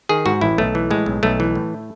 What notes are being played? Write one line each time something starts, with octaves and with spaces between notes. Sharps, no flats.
D#3 G#4
G#2 F#4
A1 E4
B1 A3
E3
A2 G#3
B1
B1 A3
E3
A2